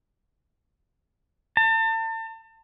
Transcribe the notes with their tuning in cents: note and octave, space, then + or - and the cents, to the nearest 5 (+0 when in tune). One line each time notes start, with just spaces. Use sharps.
A5 +35